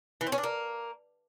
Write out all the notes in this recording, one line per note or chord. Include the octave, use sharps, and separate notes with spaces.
E3
C4
C#4
D4
A#3